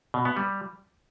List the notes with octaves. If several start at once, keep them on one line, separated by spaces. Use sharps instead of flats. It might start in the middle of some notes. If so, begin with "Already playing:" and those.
B2
B3
G3